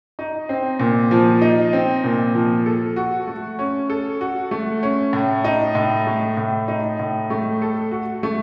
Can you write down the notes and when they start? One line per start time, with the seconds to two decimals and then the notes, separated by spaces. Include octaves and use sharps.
0.19 D#4
0.49 C4
0.80 A#2
1.11 F3
1.42 D#4
1.73 C4
2.04 A#2
2.35 F3
2.66 A4
2.96 F#4
3.27 A3
3.59 C#4
3.90 A4
4.21 F#4
4.51 A3
4.83 C#4
5.13 A2
5.44 D#4
5.75 A2
6.07 A3
6.37 A2
6.68 D#4
6.99 A2
7.30 A3
7.62 A4
7.91 F#4
8.23 A3